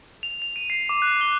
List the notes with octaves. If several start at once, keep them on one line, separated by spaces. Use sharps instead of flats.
F7
F7
D#7
C7
D6
F#6
G7